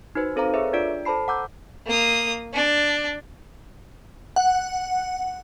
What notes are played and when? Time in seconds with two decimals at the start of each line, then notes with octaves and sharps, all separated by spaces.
0.15 D#4 F#4 B4 C5
0.36 C4 A4 C5 F5 A#5
0.54 G#4 A4 B4 C#5 E5
0.73 D4 F4 D5 D7
1.05 A4 C5 A5 B5 C7
1.28 F#5 A#5 D6 E6 G6
1.87 A#3 D#6
2.53 D4
4.36 F#5